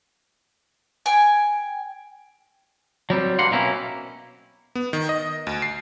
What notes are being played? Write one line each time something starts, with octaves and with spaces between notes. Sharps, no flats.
G5 G#5
F#3 G3 C4
G2 A#3 F#5 C6
B2 F#3 A#3 C4 C#4 E4
B3
D#3
D#5
D2
C7